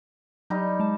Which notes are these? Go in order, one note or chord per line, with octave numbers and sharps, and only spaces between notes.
F#3 G3 D#4
G#3 A5